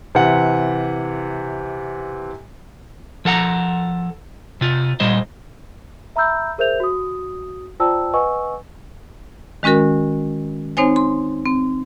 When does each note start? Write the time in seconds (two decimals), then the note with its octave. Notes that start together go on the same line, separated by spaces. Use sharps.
0.15 C3 E3 F#5
3.25 F3 A4 F#5 A#5
4.61 C3 F4
5.00 A#2 G3 C5 D#5
6.16 E5 A#5 B5 E6 G6
6.58 G#4 A#4 C5 E5 G6 F7
6.80 F#4 D#6
7.80 F4 C5 D5 G5 A5 E6
8.14 B4 D#5 F#5 G#5 C#6 E6
9.63 D#3 G#3 C#4 F#4 A#4
10.77 C4 D#4 C5 C#5 G#5
10.96 C6
11.46 C4